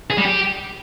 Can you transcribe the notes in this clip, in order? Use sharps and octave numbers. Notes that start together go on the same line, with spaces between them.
G#4
G3
G4